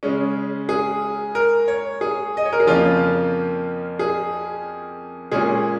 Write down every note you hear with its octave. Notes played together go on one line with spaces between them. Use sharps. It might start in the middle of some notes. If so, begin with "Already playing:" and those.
C#3 G#3 C#4
G#4
A#4
C#5
G#4
D#5
C#5
A#4
G#4
F2 C#3 F3 A#3 C#4 F4
G#4
A#2 G#3 C#4 G#4